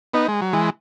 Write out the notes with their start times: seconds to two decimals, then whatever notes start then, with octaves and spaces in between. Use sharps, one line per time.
0.14 B3 D#4
0.28 G#3
0.41 F#3
0.53 E3 G#3